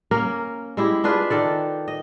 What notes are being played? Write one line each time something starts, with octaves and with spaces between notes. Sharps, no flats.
A#3 C#4 A#4
G#3 E4 G4
D4 F4 G#4 B4
D#3 A4 D5
D#5